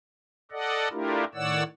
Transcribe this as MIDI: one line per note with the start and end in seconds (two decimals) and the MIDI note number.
0.52 0.88 69
0.52 0.88 74
0.52 0.88 75
0.52 0.88 78
0.91 1.24 57
0.91 1.24 62
0.91 1.24 64
0.91 1.24 65
0.91 1.24 67
0.91 1.24 70
1.35 1.63 45
1.35 1.63 51
1.35 1.63 73
1.35 1.63 74
1.35 1.63 78
1.35 1.63 88